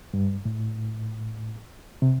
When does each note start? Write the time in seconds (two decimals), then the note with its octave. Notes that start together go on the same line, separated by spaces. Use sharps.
0.14 G2
0.45 A2
2.02 C3